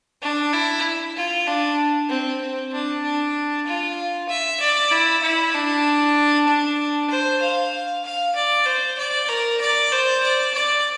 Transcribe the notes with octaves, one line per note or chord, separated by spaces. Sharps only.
D4
E4
F4
D4
C4
C4
D4
D4
F4
E5
D5
E4
E4
D4
D4
C5
F5
F5
D5
C5
D5
A#4
D5
C5
D5
D5